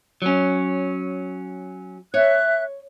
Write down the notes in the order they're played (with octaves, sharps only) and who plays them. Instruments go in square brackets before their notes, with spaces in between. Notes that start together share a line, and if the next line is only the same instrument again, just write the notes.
[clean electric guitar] F#3 C#4
[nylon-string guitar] C#5 [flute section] E5 F#6